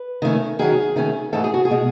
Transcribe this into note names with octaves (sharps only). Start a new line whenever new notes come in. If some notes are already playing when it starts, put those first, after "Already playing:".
Already playing: B4
D#3 A3 C#4
D#3 F#3 C#4 G#4
D#3 A3 C#4
G#2 E3 A3 D#4 A4
G#4
F#4
G#4
B2 G#3